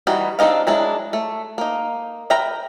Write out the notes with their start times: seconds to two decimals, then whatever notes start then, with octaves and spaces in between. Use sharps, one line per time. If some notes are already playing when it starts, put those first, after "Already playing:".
0.07 E3 G3 D#4 F#4
0.39 C4 D4 D#4 D#5 F5
0.67 F#3 G#3 D4 E4
1.13 A3
1.58 A#3 D#4
2.30 A#4 B4 E5 G5 A#5